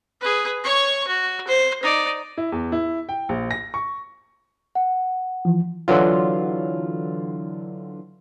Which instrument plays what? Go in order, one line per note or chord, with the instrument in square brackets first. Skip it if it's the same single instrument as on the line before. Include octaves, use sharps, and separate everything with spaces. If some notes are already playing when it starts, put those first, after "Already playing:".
[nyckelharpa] G#4 B4
C#5 C#6
F#4
C5
D#4 D5
[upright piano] E4
E2
E4
G5
A#1
A#6
C#6
[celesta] F#5
[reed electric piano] E3 F3
[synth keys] D3 E3 F#3 F4